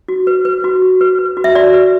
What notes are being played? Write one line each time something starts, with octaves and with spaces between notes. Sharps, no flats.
F#4
B4
B4
F#4
F#4
B4
B4
F#4
E5
F#4 D5
B4